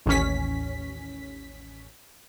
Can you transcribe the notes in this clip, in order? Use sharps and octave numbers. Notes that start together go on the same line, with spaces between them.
A1 D#2 C#4 B6